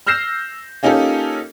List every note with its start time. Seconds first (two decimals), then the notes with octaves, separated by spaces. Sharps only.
0.07 E6 F6 G6 A#6 C7 E7
0.83 A#3 C#4 D#4 F4 G4 A4